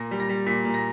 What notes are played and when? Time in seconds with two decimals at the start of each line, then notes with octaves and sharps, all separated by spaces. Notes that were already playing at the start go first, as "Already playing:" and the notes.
Already playing: A#2 A#6
0.11 G3
0.20 A#6
0.29 G3
0.46 A#2 B6
0.65 A#2
0.74 A#6